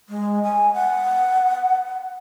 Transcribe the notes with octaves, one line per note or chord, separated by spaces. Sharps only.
G#3
G#5
F#5